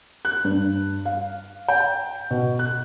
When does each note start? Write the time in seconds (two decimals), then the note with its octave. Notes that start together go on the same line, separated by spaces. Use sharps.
0.25 F#6
0.45 G2
1.05 F5
1.68 G5
2.31 B2
2.59 F#6